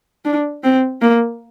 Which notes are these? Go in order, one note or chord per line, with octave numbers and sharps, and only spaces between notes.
D4
C4
A#3